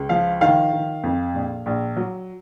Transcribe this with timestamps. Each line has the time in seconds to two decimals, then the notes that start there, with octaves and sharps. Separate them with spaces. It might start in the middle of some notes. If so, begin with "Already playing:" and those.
Already playing: C#2
0.09 F3 F5
0.41 D#3 F5
0.73 D#3
1.04 F2
1.34 A#1
1.66 A#1
1.97 F#3